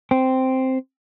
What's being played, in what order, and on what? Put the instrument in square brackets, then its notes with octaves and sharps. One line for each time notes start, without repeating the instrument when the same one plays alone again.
[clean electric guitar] C4